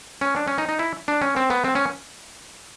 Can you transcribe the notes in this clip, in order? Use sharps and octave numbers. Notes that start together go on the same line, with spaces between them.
C#4
D4
C#4
D#4
D#4
E4
D4
C#4
C4
B3
C4
C#4